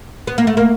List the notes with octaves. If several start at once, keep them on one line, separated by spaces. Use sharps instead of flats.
B3
A#3
A3
A#3